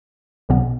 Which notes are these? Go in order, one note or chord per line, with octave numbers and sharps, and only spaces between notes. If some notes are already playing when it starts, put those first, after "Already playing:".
B1 B2 B3